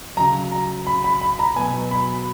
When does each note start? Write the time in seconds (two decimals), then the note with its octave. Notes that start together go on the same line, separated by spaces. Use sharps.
0.17 C#3 F#3 A#5
0.52 A#5
0.87 B5
1.04 B5
1.21 B5
1.39 A#5
1.56 B2 F#3 G#5
1.91 B5